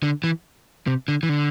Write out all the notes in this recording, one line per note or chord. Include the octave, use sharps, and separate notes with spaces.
D3
E3
C3
D3
E3
D3